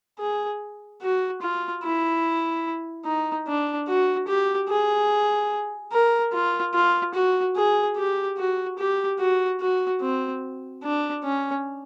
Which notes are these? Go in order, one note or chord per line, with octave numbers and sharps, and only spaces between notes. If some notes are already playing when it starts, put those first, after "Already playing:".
G#4
F#4
F4
E4
D#4
D4
F#4
G4
G#4
A#4
F4
F4
F#4
G#4
G4
F#4
G4
F#4
F#4
C4
D4
C#4